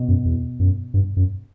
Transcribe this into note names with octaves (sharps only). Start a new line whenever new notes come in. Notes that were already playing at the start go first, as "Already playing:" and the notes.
Already playing: B2
F#2
E2
F#2
G2
F#2